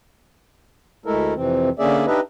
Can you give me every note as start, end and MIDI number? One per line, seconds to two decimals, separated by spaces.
1.06 1.34 38
1.06 1.34 56
1.06 1.34 57
1.06 1.34 64
1.06 1.34 69
1.06 1.34 70
1.35 1.70 41
1.35 1.70 48
1.35 1.70 52
1.35 1.70 60
1.79 2.06 50
1.79 2.06 58
1.79 2.06 61
1.79 2.06 68
1.79 2.06 74
1.79 2.06 76
2.07 2.20 62
2.07 2.20 63
2.07 2.20 67
2.07 2.20 71
2.07 2.20 75
2.07 2.20 76